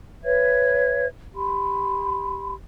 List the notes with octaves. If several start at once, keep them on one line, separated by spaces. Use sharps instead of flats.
B4 C#5 E5 G#6
G4 B5 C6